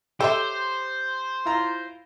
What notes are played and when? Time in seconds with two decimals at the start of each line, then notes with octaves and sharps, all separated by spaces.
0.20 G4 A4 C5 C#5 E5
1.45 E4 F4 A#5